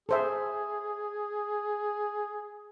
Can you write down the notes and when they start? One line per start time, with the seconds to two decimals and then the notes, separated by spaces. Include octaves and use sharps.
0.09 G#4 A4 C5 E5